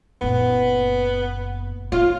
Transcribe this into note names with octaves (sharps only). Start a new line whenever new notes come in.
F#1 A#2 B3
B3 F4